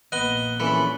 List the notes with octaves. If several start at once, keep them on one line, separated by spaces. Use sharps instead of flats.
A#1 A#3 B3 D#5 F#6 G7
A#1 E3 C#4 A4 B5